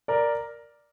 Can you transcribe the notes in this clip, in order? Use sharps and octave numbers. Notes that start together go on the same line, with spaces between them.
A#4 D5